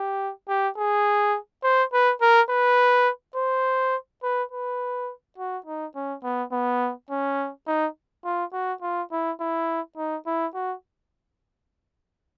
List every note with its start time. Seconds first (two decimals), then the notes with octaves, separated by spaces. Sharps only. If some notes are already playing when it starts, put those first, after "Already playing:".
Already playing: G4
0.49 G4
0.78 G#4
1.63 C5
1.93 B4
2.21 A#4
2.50 B4
3.36 C5
4.23 B4
4.52 B4
5.38 F#4
5.66 D#4
5.96 C#4
6.24 B3
6.52 B3
7.11 C#4
7.67 D#4
8.25 F4
8.53 F#4
8.82 F4
9.12 E4
9.40 E4
9.97 D#4
10.26 E4
10.54 F#4